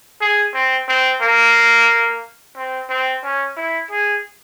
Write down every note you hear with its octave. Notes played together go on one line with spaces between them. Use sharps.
G#4
C4
C4
A#3
C4
C4
C#4
E4
G#4